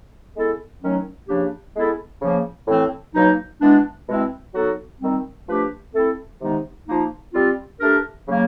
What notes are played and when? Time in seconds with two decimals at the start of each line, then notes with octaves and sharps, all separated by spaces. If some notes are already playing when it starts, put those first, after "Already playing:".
0.35 G#3 B3 E4 A4
0.81 D#3 F#3 A3 C#4
1.28 C#3 F3 A#3 D4 G4
1.75 G#3 B3 E4 A4
2.21 C#3 F3 A#3
2.68 A2 E3 A3 C4
3.14 B2 F#3 A#3 D#4
3.61 E3 G#3 B3 D4
4.08 B2 G#3 C4 E4
4.54 F#3 B3 D#4 F#4 A4
5.00 D#3 G3 C4
5.47 F3 A3 D4 G4 B4
5.94 A3 C4 E4 A4
6.41 C3 D#3 G#3 B3 D#4
6.87 F3 A#3 D#4
7.33 G3 C4 F4
7.80 A3 D4 G4 A#4
8.26 C#3 F#3 A#3